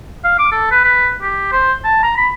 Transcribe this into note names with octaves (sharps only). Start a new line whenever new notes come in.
F5
D6
A4
B4
B4
G4
C5
A5
A#5
B5